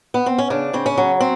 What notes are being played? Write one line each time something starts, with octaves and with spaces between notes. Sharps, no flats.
B3
C4
C#4
C#3 D4
C#3 C4
C#4
F#3
C4